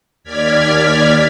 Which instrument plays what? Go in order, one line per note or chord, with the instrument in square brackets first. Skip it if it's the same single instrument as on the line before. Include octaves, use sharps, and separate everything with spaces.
[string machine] D#2 D5 F6 G#6 B6